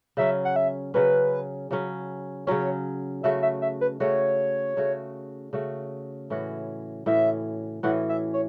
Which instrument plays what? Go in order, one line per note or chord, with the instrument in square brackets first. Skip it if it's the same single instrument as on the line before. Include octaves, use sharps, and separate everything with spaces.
[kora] C#3 F#3 C#4 [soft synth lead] E5
[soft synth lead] F#5
E5
[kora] C#3 F#3 C#4 [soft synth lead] B4
[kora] C#3 F#3 C#4
[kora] C#3 F#3 C#4 [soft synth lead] C#5
[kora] C#3 A3 F#4 [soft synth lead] E5
[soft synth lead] E5
E5
B4
[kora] C#3 A3 F#4 [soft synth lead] C#5
[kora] C#3 A3 F#4
C#3 A3 F#4
A2 E3 C#4 F#4
[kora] A2 E3 C#4 F#4 [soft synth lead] E5
[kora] A2 E3 C#4 F#4 [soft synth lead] F#5
[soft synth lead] E5
C#5